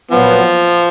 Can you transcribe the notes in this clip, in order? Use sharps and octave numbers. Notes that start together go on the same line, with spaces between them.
A#2 F3 F#3 B3